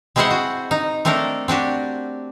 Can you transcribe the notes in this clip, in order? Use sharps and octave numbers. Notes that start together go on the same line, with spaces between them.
G#3 C4 E4 G#4 C5 F#5
F#4
D#4
A3 C4 D4 A4 A#4
C4 D4 F#4 G4